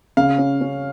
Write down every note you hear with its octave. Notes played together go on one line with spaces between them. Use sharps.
C#3 F5
C#4
C#4